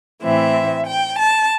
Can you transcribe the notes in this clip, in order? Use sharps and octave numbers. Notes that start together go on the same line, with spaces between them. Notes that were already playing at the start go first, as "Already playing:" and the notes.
A2 E3 C4 E5
G5
A5